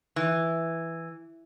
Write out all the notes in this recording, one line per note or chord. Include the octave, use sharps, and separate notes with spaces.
E3